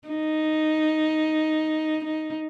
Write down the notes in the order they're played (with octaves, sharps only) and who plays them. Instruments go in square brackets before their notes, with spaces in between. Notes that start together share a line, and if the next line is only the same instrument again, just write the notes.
[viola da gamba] D#4
D#4